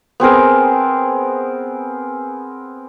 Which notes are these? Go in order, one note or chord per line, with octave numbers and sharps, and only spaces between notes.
B3 C4 G#4 A#4